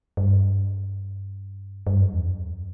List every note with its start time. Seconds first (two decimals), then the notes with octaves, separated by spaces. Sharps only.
0.17 G2
1.87 G2
2.00 F#2
2.14 E2
2.27 F#2